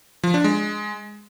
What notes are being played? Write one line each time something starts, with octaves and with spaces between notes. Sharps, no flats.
F3
D4
G#3